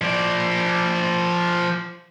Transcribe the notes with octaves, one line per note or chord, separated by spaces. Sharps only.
F3 D5